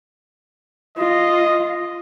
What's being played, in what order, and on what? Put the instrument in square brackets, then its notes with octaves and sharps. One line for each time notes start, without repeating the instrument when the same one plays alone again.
[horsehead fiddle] F4 [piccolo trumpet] D#5